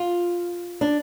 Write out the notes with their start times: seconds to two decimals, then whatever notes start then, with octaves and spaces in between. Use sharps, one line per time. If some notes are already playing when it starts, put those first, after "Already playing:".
Already playing: F4
0.81 D4